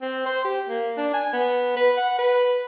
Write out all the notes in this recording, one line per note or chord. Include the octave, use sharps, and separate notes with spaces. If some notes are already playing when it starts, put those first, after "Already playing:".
C4
C5
G4
A#3
D4
G#5
B3
B4
F#5
B4